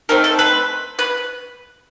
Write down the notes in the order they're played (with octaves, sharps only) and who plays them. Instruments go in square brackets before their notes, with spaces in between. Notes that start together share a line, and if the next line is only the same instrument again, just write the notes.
[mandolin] A3 C4 D#4 A#4
A4
B4
B4